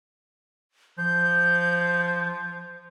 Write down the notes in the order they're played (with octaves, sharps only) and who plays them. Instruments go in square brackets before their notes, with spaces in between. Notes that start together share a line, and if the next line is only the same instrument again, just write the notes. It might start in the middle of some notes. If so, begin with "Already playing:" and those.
[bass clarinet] F3 [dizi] G6